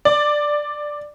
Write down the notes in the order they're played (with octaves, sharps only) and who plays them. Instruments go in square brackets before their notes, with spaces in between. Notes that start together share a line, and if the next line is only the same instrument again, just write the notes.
[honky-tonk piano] D5